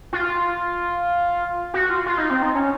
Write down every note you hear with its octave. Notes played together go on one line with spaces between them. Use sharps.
F4
F#4
F4
F4
D#4
C4
D#4
C#4